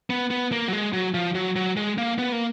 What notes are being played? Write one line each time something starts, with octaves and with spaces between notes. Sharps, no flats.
B3
B3
A#3
F#3
G#3
F#3
F3
F#3
F#3
G#3
A#3
B3
A#3